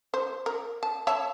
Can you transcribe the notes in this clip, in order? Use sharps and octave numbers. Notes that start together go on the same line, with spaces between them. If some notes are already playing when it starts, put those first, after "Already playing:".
C5
A#4
A5
C#5 E5 A5